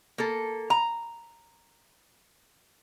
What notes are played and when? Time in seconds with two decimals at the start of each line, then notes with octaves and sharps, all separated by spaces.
0.18 A#3 A4
0.70 A#5